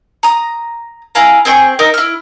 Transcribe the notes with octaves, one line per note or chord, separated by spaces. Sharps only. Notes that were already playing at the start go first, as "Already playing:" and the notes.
A#5 D#6
E4 G#4 F5 A#5
C4 G#4 G5 C#6
D#4 A#4 D#5 E5
E4 F6